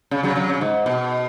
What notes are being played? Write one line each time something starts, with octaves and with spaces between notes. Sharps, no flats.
C#3
C#3 F#3
C#3 F#3
C#3
G#2
B2